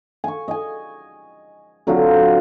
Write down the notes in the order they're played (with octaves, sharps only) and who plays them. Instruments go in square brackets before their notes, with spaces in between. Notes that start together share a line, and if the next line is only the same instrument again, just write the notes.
[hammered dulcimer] G#5 C#6
D#5 G#5
D3 F#3 C4 F4